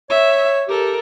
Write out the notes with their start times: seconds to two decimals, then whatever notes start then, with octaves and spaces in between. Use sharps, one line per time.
0.10 C#5 E5
0.68 G4 A4 A#4